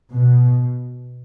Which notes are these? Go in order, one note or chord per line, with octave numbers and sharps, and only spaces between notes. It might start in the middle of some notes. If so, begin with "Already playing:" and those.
B2